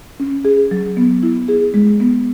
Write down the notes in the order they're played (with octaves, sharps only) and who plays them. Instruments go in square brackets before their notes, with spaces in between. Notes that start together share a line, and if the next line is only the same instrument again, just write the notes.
[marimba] C#4
G#4
F#3
B3
E4
G#4
G#3
B3